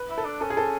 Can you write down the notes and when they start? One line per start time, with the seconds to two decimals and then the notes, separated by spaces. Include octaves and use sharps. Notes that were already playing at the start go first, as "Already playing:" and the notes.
Already playing: B4
0.10 E4
0.18 A4
0.25 D4
0.41 C#4 A4
0.50 G#4
0.57 A4